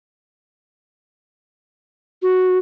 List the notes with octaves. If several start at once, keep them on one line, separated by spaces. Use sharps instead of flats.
F#4